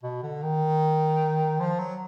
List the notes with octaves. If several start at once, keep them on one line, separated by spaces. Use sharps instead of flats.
B2
D3
D#3
F3
F#3